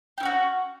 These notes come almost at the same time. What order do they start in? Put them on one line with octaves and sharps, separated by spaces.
G4 E4 C#4 F#4